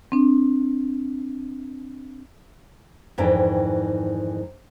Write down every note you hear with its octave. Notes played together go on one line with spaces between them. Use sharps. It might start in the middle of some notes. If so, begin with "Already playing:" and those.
C4 D4
F2 G#2 D#3 E3 D4 G5